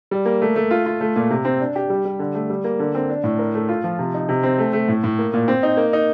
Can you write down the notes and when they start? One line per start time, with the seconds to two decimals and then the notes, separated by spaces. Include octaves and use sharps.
0.11 G3
0.25 A#3
0.42 A3
0.56 A3
0.71 F4
0.86 F4
1.01 A3
1.16 A#2
1.30 C3
1.45 C4
1.60 D4
1.76 G4
1.90 G3
2.05 G3
2.19 D3
2.35 A3
2.50 G3
2.64 A#3
2.79 D3
2.95 C4
3.10 D4
3.24 A2
3.39 A#4
3.54 A3
3.69 F4
3.84 F3
3.99 C3
4.14 D#4
4.29 C3
4.43 C4
4.58 A3
4.73 A3
4.88 A2
5.04 A2
5.19 A#3
5.33 A#2
5.48 C4
5.63 D#4
5.77 A#3
5.93 D#4